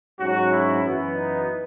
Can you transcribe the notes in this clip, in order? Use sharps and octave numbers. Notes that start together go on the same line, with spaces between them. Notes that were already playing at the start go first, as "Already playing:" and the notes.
G#2 F#3 C#4 F#4
E4
F#2 E3 B3
D#4